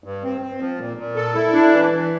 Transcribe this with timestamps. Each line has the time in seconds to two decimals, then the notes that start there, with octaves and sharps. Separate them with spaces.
0.04 G2
0.23 C4
0.41 C4
0.60 F3
0.79 A#2
0.97 A#2
1.16 A4
1.35 E4
1.53 D4
1.72 E3
1.91 E3